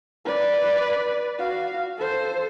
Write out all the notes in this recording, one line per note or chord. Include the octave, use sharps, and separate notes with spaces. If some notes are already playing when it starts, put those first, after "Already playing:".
B4 D5
F#4 F5
A4 C5